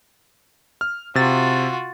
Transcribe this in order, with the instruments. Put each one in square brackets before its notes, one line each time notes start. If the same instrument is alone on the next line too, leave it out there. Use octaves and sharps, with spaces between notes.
[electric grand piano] F6
[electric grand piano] C3 A6 [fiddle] F4 F#4